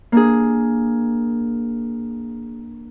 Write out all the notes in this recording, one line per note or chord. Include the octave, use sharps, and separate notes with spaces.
A#3 D4 G#4